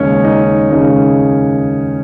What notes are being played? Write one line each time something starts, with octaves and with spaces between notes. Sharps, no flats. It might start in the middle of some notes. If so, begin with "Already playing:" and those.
Already playing: D#2 C#3 G#3 C#4
D#4
D#2 C#3 G#3 D#4